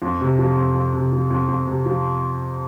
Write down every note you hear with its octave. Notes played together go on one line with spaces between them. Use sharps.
F2
C3
F3
F2
F2
C3
F3
F2
F2
C3
F3